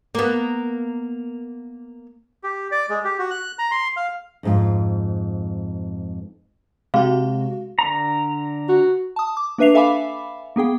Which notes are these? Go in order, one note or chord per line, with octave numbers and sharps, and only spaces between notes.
A#3 B3
G4
D5
G#3
G4
F#4
F#6
A#5
C6
F5
F2 G#2 F4
C3 G#3 F#4 F5
D3 A#5
F#4
A5 D#6
D6
A#3 D4 B4 E5 C7 F7
A4 E5 F5 G#5 B5 D6
A#3 B3 G#4 G5